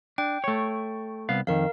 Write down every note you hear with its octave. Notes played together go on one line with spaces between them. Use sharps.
D4 G5
A3 C#5
C2 B3 F5
F2 D#3 A#4 F5